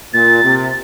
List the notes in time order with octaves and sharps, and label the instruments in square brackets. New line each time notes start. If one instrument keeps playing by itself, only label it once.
[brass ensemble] A#2 [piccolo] A6
[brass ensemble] C3